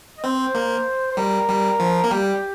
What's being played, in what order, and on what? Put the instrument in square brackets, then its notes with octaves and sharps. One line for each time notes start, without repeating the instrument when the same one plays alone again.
[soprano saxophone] D#5
[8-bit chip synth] C4 [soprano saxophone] C5
[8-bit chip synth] A#3
[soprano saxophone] C5
[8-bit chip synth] G3 [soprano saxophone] A#4
[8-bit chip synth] G3
F3
A#3
[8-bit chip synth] G3 [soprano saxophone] G4